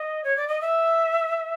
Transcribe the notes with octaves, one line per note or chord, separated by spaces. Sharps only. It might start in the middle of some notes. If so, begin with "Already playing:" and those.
Already playing: D#5
C#5
D5
D#5
E5